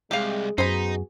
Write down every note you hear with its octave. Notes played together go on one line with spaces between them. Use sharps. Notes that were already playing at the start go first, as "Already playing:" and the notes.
C2 G#3 G4 F5
F#2 B3 D#4 F#4 G#4 C5 G#5 B5